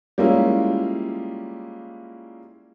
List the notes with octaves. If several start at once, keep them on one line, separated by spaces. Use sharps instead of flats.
G3 G#3 A#3 C#4 E4 F4